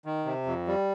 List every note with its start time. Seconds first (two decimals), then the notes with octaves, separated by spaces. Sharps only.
0.05 D#3
0.25 C3
0.46 F2
0.67 G3